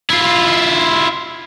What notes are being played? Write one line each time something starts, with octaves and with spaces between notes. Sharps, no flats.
E4 F4